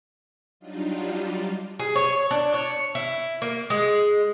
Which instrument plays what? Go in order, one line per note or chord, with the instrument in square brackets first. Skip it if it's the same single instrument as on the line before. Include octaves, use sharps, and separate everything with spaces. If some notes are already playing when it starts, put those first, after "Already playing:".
[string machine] F#3 G3 D4 D#4 F4
[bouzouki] G#4
C#5
D4
C#5
E4
A#3
G#3